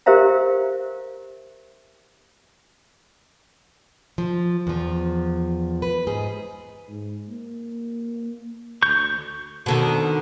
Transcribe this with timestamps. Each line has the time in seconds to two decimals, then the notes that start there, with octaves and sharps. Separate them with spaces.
0.06 G4 A#4 C5 E5 F5 A#5
4.18 F3
4.67 E2 F3
5.82 B4
6.07 G#2 G#4
6.88 G#2
7.29 A#3
8.82 D2 C#6 G6
9.66 B2 D3 D#3